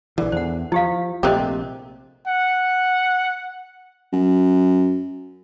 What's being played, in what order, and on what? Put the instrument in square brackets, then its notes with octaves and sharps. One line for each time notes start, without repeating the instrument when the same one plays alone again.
[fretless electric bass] A#1 E3 [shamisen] D3
[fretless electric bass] E2 [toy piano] C5 F#5
[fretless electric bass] F3 [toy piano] E4 G4 F5
[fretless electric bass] A#1 C3 [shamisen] A3 F4 G4 [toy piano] A#4 C5 D#5
[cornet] F#5
[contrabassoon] F#2